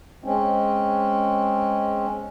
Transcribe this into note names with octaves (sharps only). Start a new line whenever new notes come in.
G#3 C4 C#4